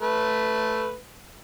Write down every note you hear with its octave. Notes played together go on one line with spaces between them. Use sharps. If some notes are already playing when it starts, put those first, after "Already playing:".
A3 B4